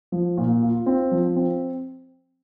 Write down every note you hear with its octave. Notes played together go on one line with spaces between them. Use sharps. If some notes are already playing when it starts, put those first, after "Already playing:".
F3
A#2
F4
C4
F3
C4